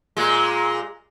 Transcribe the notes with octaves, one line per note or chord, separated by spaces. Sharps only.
A#2 G#3